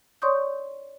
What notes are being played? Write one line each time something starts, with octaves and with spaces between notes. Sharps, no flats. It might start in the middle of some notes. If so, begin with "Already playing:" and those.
C#5 D5 C6 C#6 D#6 G6